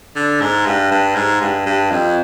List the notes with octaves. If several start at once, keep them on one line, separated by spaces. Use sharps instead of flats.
D3
G#2
G2
G2
G#2
G2
G2
F2